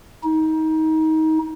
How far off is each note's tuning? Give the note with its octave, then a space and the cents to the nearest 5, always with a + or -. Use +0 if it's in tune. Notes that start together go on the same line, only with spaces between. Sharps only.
D#4 +25